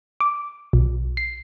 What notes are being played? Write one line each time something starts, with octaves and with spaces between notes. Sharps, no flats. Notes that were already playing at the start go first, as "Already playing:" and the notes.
D6
B1
C7